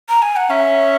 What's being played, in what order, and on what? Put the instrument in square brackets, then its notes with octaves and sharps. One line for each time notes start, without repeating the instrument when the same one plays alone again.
[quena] A#5
G#5
F#5
[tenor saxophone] C#4 [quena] E5